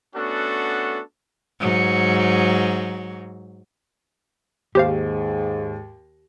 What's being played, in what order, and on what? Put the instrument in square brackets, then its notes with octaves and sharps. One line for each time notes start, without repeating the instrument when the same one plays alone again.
[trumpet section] A3 B3 C#4 D4 F#4 A4
[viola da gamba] G#2 F#3
[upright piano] D#2 [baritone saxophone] G#2 [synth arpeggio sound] G4 C5 F5